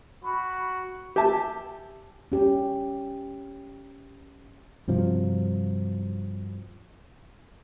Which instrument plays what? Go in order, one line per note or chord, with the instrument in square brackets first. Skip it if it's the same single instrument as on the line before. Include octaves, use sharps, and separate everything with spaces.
[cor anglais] F#4 [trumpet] B5
[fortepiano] G4 E5 G#5 A5
[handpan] C#4 G4
[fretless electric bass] G2 C3 F3 F#3